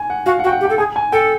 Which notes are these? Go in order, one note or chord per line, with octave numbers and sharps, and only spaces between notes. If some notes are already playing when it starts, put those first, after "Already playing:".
Already playing: G#5
F#5
F#4 F5
F#5
F#4
G5
F#5
G4
G5
A4
G#4 G#5
G#5
A4 G5